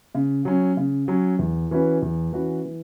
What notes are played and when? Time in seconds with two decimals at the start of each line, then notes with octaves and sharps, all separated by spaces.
0.15 C#3
0.45 F#3 C#4
0.77 C#3
1.08 F#3 C#4
1.39 E2
1.71 E3 C#4 F#4 B4
2.02 E2
2.33 E3 C#4 F#4 B4
2.65 E3